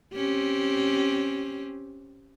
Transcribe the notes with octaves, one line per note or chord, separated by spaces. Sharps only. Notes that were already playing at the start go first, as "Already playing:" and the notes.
C4 C#4 G4